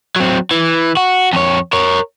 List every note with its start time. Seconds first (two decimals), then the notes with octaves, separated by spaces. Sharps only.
0.16 F#3 C4
0.51 E3
0.97 F#4
1.33 F2 C#5
1.73 A#4 C#5